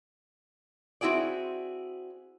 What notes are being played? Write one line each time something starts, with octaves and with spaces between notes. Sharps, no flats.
C4 E4 F#4 G#4 D5